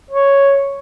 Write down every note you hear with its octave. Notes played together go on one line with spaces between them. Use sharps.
C#5